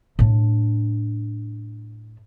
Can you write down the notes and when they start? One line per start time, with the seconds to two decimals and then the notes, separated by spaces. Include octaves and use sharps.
0.19 A2 D4